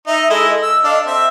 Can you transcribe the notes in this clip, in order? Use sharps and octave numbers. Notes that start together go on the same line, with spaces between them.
D#4 E5
G#3 E4 A4 D#5
D#5
E6
D4 A4 F5
C4 E5